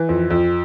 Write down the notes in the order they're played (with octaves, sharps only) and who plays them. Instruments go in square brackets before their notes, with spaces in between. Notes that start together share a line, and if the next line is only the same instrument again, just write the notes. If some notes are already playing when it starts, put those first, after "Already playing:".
Already playing: [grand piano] E3
F2
F2